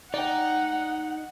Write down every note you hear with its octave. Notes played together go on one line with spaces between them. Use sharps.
D#4 D5 F#5 G5